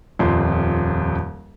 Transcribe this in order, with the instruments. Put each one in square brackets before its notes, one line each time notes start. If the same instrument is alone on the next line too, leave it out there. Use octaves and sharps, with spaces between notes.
[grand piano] D#1 F2 C6